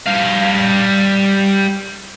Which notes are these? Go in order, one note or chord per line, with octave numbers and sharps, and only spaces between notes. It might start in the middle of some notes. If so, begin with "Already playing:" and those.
G3 F5